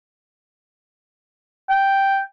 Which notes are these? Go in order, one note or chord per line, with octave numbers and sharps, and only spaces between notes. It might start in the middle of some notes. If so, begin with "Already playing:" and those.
G5